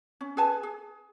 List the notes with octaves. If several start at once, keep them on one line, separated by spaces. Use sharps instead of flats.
C#4
G#4 B4 G#5 A5
G#4